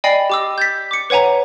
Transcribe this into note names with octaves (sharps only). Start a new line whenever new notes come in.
D5 D#5 G5 G#5 B5 C7
G4 D6 E6
G6 A6 B6
D6 C#7
B4 C#5 F#5 G#5 A#5